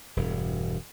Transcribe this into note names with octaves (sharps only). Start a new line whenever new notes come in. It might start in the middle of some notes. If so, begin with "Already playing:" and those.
E1 G2